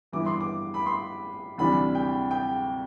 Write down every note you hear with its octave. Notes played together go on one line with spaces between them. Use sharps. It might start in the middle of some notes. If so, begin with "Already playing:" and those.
G1 G2 E3 B3 E4 D6
C6
D6
B5
C6
D2 C3 E3 G3 D4 B5
G5
G5